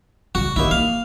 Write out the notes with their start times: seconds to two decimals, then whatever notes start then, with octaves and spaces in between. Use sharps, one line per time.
0.35 C#3 G3 F#4
0.56 D#2 D3 D#4 E4
0.71 A#3 F5